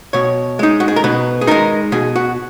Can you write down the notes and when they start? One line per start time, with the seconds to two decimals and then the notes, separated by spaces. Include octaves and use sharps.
0.13 B2 C#5
0.59 G#3 D#4
0.80 F#4
0.88 G#4
0.96 A#4
1.04 B2 B4
1.41 G#4
1.47 G#3 D#4 A#4
1.92 B2 G#4
2.16 F#4